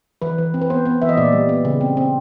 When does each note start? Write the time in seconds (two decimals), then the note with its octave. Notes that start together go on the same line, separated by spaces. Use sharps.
0.22 E3 B4
0.38 E3
0.54 C4
0.62 B4
0.70 B3 C5
0.85 B3
1.02 E3 E5
1.09 D#5
1.17 A#2 D5
1.33 G3
1.49 B3
1.65 C#3
1.81 C4
1.97 C4